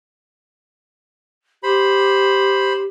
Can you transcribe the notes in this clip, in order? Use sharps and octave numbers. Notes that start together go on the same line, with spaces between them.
G4 C5 B5